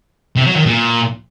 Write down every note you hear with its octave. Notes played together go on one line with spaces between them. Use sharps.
C3
F#3
D#3
A#2